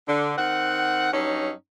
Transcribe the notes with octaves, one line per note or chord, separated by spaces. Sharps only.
D3
D#3 C4 F#5
G2 F#3 C#4 D#4